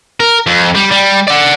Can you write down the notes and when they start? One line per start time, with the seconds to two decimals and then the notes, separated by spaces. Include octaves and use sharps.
0.20 A#4
0.46 F2
0.75 G3
0.92 G3
1.28 D5 F#5